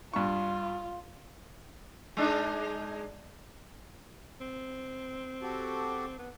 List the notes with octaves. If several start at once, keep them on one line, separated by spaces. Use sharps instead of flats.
G2 F4 C#6
G#3 D4 D#4
C4
F#4 G4 A4
B3